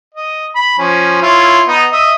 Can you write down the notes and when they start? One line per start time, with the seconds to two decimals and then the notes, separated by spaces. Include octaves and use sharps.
0.15 D#5
0.56 B5
0.78 F3 C#4
1.22 E4 F4 C#5
1.68 B3 D#4
1.92 D#5 E5